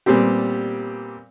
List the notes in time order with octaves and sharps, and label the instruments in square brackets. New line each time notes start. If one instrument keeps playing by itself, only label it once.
[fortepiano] A#2 G3 B3 C4 G4